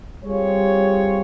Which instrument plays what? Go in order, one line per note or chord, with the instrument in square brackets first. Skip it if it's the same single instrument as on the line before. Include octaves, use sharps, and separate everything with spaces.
[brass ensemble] G3 C4 F4 G#4 C#5